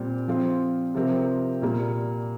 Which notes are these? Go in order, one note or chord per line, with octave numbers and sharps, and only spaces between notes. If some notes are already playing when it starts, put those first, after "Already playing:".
Already playing: A#2 G3 C4 G4
F3 C4 F4
C3 F3 C4 G4 A#4
A#2 G3 A#3